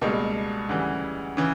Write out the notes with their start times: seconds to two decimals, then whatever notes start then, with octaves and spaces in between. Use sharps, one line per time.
0.01 C#2 B2 G3 A#3
0.69 D2 C#3 E3 G3
1.37 C#3 E3